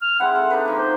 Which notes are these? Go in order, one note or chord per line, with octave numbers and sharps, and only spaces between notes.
F6
G#3 C4 E4 F#5
A4
D4 D#4 B4
D#3 F3 A#3
C5